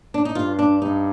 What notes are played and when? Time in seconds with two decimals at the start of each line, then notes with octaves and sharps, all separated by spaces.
0.14 D4
0.25 D#4
0.35 G2 F4
0.59 D4
0.82 G2 D#4